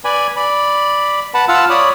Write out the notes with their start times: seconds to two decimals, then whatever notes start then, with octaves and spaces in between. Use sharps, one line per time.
0.05 B4 D5 G#5 B5
0.36 D5 B5
1.34 B4 F#5 A5 B5
1.48 F4 F5 F#5 A5 E6
1.70 C#5 D5 B5 D#6